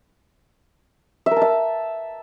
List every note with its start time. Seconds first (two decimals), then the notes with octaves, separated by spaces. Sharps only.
1.26 E5
1.31 A#4
1.36 A5
1.42 E5